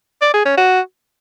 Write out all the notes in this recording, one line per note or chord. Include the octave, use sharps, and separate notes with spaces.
D5
G#4
C#4
F#4